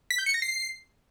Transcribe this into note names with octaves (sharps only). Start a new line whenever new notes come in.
B6
G6
C#7
A#6
C7